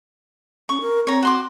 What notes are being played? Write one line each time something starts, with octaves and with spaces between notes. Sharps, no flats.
C#4 C#6
A#4
C4 C#5 A#5
F#4 C6 D6